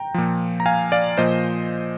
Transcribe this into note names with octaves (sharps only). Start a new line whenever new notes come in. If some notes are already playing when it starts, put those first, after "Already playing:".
Already playing: G5 A#5
A#2 F3
A#5
F5 G#5
D5 F5
A#2 F3 C5 D#5